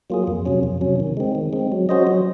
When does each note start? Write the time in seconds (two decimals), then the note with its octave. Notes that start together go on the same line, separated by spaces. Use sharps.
0.10 F#3 A#3 F4 G#4
0.27 F2
0.45 C3 F#3 C#4
0.63 F2
0.81 C3 F#3 C#4
1.00 D#3
1.17 G#3 C4
1.35 D#3
1.53 G#3 C4
1.72 F#3
1.89 C#4 F#4 C5 D#5
2.07 F#3